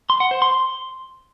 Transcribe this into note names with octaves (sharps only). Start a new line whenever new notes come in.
C6
F#5
C5
C6